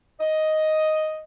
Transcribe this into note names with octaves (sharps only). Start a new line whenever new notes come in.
D#5